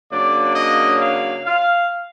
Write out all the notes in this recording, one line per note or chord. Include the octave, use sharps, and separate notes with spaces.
C#3 F#3 A#3 D4 D5
D#5
F5
F5